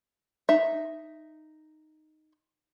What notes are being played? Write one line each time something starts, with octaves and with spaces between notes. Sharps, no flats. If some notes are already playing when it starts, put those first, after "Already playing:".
D#4 E5